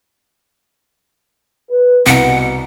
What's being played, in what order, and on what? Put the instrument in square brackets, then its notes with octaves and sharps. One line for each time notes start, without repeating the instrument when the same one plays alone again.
[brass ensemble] B4
[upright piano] C2 [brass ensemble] B2 [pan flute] F#5